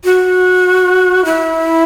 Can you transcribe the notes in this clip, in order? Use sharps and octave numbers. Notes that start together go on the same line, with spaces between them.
F#4
E4